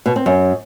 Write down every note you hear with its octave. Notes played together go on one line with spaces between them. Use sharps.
B2
C4
F#2